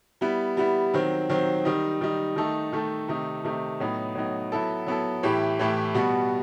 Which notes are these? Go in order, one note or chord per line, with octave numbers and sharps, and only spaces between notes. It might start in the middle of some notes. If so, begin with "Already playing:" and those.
G3 B3 E4
G3 B3 E4
D#3 F#3 C4
D#3 F#3 C4
D#3 G3 D#4
D#3 G3 D#4
D#3 A3 D#4 A4
D#3 A3 D#4 A4
C3 D#3 A3 D#4
C3 D#3 A3 D#4
A2 F#3 B3 D#4
A2 F#3 B3 D#4
F#3 B3 E4 A4
F#3 B3 E4 A4
A2 E3 A3 E4 G4
A2 E3 A3 E4 G4
B2 G3 B3 F#4